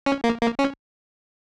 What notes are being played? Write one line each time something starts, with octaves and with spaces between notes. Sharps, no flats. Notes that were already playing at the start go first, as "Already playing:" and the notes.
C#4
A#3
A#3
C#4